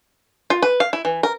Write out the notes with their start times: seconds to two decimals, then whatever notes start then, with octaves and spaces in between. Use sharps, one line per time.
0.50 F4
0.62 B4
0.80 F5
0.93 E4
1.05 E3
1.23 A#4